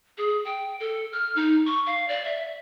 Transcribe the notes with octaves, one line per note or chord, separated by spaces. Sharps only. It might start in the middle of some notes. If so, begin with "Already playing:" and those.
G#4
G5
A4
F6
D#4
C#6
F5
D5
E5